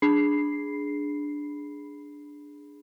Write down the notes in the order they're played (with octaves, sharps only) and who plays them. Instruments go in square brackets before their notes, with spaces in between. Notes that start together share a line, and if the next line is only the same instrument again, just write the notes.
[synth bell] D4 G#4 B5 C7